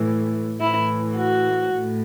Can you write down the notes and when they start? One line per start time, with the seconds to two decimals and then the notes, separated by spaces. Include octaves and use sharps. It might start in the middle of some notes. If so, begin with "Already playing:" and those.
Already playing: A2 E3
0.60 A2 E3 E4
1.16 F#4
1.72 A2